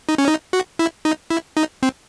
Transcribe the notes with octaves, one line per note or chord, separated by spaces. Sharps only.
D#4
C#4
D#4
F#4
E4
D#4
E4
D#4
C4